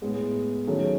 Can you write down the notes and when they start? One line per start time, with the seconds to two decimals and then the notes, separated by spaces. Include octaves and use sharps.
0.02 A2 G#3 B3
0.67 D#3 F#3 A3 C#4 G#4